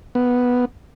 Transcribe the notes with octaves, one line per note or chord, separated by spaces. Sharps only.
B3